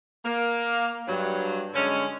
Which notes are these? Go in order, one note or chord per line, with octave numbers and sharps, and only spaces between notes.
A#3
G2 F#3
D3 G#3 C#4